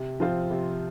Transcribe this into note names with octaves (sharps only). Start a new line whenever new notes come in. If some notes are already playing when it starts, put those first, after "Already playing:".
Already playing: C3
F3 C4 F4 C5
C3